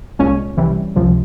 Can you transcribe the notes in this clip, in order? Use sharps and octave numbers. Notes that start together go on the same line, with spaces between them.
C2 A#2 G#3 C#4
C2 C3 E3 G3
C#2 C3 F3